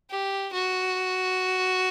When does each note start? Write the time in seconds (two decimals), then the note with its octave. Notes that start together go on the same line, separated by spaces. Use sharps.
0.10 G4
0.53 F#4